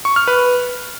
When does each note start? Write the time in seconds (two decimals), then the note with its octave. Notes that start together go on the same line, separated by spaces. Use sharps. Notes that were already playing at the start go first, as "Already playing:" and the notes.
0.05 C#6
0.16 F6
0.28 B4